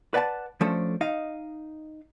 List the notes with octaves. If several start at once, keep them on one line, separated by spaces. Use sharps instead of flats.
B4 D5 F#5 G#5 A5
F3 A3 C#4 D4 A4 C5
D#4 D#5 F5